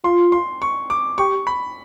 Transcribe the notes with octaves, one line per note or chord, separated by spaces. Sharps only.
F4 C6
C6
C#6
D6
G4 C#6
B5